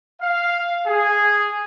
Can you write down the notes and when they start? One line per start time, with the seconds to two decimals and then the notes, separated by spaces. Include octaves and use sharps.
0.21 F5
0.87 G#4